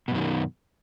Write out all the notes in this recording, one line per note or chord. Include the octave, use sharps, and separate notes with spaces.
F#2 B2 D#3